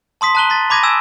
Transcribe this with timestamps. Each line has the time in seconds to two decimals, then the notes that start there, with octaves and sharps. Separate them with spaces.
0.21 A5 C6 D#6 B6
0.35 A5 A#5 F#6 D#7 F#7 G7
0.50 A6 B6
0.70 A5 B5 D6 G#6 A#6 D#7
0.83 G#5 E6 G#6 E7